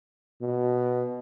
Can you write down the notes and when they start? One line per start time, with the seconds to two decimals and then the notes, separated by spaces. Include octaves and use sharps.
0.41 B2